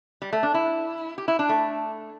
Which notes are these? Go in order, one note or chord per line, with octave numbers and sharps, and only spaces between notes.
G3
A3
D4
E4
G4
E4
D4
A3